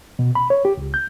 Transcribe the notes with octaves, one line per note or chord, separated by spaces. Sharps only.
B2
B5
C#5
G4
C#2
G6